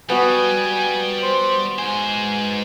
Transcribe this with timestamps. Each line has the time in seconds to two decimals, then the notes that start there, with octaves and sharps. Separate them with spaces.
0.10 G3 B3 F#4 G#5
1.22 C5
1.79 G#2 C5 G#5